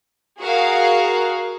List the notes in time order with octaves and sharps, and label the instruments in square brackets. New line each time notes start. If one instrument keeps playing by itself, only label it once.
[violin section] F#4 G#4 A#4 F5